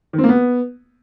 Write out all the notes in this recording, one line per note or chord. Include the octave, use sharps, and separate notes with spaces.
D#3
C4
A#3
B3